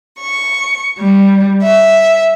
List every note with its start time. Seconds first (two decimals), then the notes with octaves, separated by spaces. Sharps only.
0.20 C#6
0.97 G3
1.63 E5